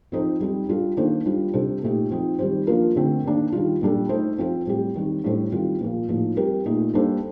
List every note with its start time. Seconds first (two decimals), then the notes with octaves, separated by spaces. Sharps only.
0.12 F3 C4 D#4 A4 C5
0.40 G3 C4 D#4
0.69 G3 D4 F4 A4
0.97 D#3 A#3 D4 A4 C5
1.26 G3 D4 F4
1.53 C3 G3 D4 A4 C5
1.82 A#2 A3 D#4 G4
2.10 F3 C4 D#4
2.39 D#3 G3 C4 G4 C5
2.67 F3 A#3 D4 F4 A#4
2.96 D3 A3 C4
3.24 D#3 A#3 D4
3.52 D#3 G3 D4 F4
3.81 A#2 G3 D4 A4
4.09 A3 D#4 A4 C5
4.38 F3 C4 F4 A4 C5
4.67 A2 G3 C4 G4
4.95 D#3 G3 C4
5.24 A2 G3 D4 A4 C5
5.52 D#3 G3 C4 F4
5.81 A#2 F3 A#3
6.09 A2 F3 A#3 D#4
6.37 G3 C4 G4 A#4
6.65 A#2 A3 D#4
6.94 G3 A#3 D4 A4 C5